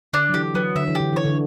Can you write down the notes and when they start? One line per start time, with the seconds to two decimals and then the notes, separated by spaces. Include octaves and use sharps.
0.13 D3 D4
0.29 F#3
0.34 E3 G4
0.54 F#3 B3
0.75 D3 E5
0.87 E3
0.95 D3 G4
1.13 E3 C#5
1.25 D3